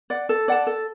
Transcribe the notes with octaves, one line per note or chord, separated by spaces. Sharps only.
D5 F#5
A4
D5 F#5 A5
A4